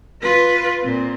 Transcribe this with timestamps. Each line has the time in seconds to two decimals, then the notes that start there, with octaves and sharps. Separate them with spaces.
0.22 F4 B4
0.82 A#2 C4